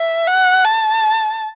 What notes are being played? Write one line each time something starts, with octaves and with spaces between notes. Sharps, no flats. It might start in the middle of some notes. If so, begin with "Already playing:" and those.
Already playing: E5
F#5
A5